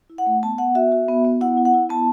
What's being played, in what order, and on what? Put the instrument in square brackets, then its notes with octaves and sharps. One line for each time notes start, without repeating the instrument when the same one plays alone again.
[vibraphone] E4
F#5
A3
B3 A5
B3 F#5
F#4 E5
F#4
B3
B3
E4 F#5
E4
F#5
E4
B3 A5